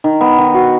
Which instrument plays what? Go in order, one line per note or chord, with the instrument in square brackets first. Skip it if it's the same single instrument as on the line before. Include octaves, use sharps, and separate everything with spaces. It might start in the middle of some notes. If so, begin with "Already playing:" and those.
[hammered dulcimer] D#3
B3
D#3
F#4